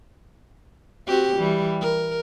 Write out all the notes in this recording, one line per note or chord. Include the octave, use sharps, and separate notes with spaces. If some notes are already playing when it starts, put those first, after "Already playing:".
C4 F#4 G4
E3 G3
A#4